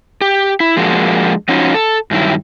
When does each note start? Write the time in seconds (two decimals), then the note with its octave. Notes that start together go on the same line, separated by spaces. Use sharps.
0.21 G4
0.60 E4
0.77 F3 G#3 A#3 D4 F#4
1.49 F3 C#4 D#4 F4 F#4
1.74 A4
2.11 G2 D#3 F#3 E4